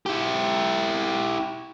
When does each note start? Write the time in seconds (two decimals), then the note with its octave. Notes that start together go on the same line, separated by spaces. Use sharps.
0.06 E4 G4